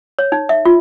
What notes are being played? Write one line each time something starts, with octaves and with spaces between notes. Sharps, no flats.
C#5
D#4
E5
F4